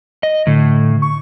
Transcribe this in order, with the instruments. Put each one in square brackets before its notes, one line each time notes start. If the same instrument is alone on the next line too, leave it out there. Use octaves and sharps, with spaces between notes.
[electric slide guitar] D#5
[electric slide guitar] A2 [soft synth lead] D3
[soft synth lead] C#6